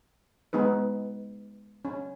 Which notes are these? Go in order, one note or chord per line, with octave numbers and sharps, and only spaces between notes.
G#3 B3 D#4 B4
C#4